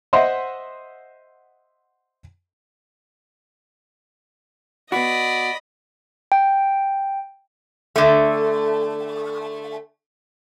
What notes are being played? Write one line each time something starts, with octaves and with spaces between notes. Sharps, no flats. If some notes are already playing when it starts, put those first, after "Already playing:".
C5 D#5 E5 F#5 C6
B3 F#4 D5 D#5 B5
G5
D3 A3